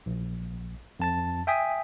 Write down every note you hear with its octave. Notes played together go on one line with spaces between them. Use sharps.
A#1
F2 A5 A6
E5 G5 G#5 D#6 B6